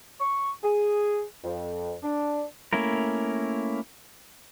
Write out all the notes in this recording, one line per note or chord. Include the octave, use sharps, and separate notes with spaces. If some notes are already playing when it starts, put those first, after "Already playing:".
C#6
G#4
F2
D4
A3 A#3 C#4 E4 A#4